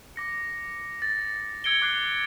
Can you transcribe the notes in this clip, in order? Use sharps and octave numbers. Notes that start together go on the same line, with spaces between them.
D6 A#6 C#7
A6
E6 G#6 C#7 D7 G7
D6 F#6 C7